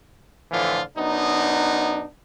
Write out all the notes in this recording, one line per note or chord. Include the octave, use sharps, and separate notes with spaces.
A2 D3 E3 F3 F4
F#2 B3 D4 D#4